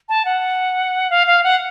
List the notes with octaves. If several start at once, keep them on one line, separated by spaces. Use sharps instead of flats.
A5
F#5
F5
F5
F#5